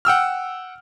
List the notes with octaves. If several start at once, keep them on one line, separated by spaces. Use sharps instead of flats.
F#5 G5 E6 F6